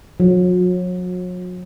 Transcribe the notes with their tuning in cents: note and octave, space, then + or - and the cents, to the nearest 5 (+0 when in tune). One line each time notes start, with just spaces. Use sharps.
F#3 -40